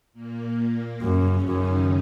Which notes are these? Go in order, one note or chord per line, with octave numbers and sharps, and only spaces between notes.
A#2 A#3
F#2 C#3 C#4
F#2 D#3 D#4